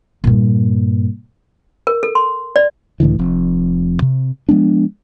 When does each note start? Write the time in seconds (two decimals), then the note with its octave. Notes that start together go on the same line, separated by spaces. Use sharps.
0.24 G2 A#2
1.87 A#4
2.03 A4
2.15 C6
2.56 D5
3.00 C#2 A2 D3 E3
3.19 F1 F2
4.02 C3
4.49 F3 G#3 B3 D4